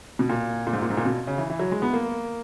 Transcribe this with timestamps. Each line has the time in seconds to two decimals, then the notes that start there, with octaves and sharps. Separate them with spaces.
0.19 B2
0.29 A#2
0.67 A#2
0.73 G#2
0.82 A#2
0.90 G#2
0.97 A#2
1.05 B2
1.27 C#3
1.38 E3
1.50 E3
1.59 F#3
1.72 G#3
1.82 B3
1.93 A#3